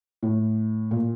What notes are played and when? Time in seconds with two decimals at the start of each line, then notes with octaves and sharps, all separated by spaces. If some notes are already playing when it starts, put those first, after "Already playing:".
0.23 A2
0.91 A#2